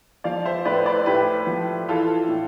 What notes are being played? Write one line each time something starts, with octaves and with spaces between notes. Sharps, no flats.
F3 D5 F5
C5 E5
A2 B4 D5
C5
B4 D5
A2 G4 B4
F3
E3 F4 A4
A2